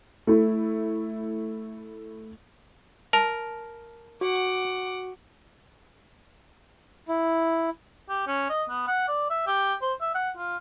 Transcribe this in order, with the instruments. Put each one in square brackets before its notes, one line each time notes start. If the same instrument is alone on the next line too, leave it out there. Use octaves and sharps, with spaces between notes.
[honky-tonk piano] A3 E4
[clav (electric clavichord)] A#4 [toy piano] A5
[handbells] F#4 [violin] F#5 D6
[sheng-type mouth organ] E4
[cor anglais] G4
C#4
D#5
B3
F#5
D5
E5
G4
C5
E5
F#5
F4